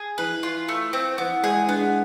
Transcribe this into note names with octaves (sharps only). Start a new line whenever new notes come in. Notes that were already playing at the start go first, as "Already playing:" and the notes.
Already playing: G#4
E3 B4
F4
A3
C4
E3 B3
G#3 G#4
B3 D4